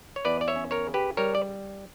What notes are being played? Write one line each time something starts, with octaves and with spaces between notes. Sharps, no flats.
C#5
E2 B4 D5
D5
C#5 E5
C#4
A#4 C#5
C#3
G4 B4
G3 A#4 C#5
D5